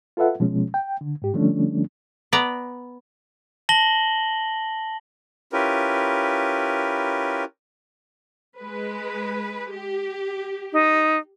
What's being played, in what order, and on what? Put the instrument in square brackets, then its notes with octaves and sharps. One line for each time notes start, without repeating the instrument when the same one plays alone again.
[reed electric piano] F4 A4 B4 E5 F#5
B2 F3 G#3 C#4
G5
D3
G#2 G4
D3 F3 G3 A3 C#4 D4
[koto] B3 D5 A#5
[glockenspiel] A5 A#6 F#7 G7
[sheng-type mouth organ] C#4 E4 F4 G4 A#4 B4
[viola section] G#3 B4
G4
[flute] D#4